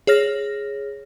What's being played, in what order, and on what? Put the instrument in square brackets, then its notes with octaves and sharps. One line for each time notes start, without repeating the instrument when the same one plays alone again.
[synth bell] G#4 C#5 F6 A#6